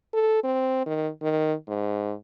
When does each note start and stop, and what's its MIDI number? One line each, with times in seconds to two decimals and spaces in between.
0.14 0.42 69
0.44 0.83 60
0.86 1.08 51
1.22 1.54 51
1.68 2.14 44